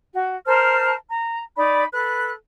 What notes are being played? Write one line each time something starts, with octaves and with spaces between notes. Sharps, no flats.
F#4
A#4 C5 A5 F6
A#5
D#4 D5 B5
A4 B4 F#6